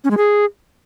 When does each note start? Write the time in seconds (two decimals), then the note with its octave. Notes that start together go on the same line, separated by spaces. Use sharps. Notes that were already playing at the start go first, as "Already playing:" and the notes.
0.04 C#4
0.11 G#3
0.17 G#4